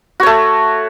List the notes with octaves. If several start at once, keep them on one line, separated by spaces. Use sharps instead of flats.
A3 F#4 C#5